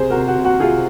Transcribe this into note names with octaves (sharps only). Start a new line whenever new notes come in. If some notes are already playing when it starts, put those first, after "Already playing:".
Already playing: C3 G#4 C5
F#4 A#4
C3
F#4
C3
F#4
C3 F4 G#4